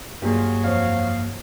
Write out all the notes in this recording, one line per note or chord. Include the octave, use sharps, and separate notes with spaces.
G2 F#3 A#3 F4 G4 G#4
F2 C#5 F5